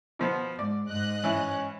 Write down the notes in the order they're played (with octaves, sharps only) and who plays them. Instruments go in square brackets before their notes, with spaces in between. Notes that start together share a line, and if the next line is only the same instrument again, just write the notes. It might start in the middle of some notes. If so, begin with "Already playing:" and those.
[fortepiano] B2 F3 B3
[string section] G#2 [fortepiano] D5
[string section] G#2 D#5 F#6
[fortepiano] E3 [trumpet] C#4